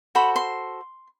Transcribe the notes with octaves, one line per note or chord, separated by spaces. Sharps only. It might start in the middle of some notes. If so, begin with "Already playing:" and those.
F#4 A4 C5 B5
C6